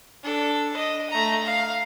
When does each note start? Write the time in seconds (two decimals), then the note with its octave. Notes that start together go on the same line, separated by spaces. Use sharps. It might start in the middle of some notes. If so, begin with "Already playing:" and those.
0.24 D4 A4
0.77 D#5
1.10 A3 A#5
1.46 F5